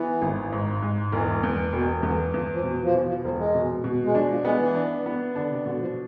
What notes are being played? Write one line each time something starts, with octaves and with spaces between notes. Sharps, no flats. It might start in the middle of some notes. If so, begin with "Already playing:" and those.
Already playing: E3 B3
G#1
G#2
G#2
E1 E3
E2
E1 B2
C3
E2 D3
E2 F3
F3
B2
F3
B2 E3
F3
E1 F3
G#3
B2
B2
G#3
F3 D4
F3
G#3 B3
E3
D4
B3
D3 D4
C3
B2 D3
F3